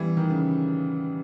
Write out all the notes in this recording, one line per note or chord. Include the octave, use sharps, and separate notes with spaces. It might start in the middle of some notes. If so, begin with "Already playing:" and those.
Already playing: E3 G3 B3
D#3
C#3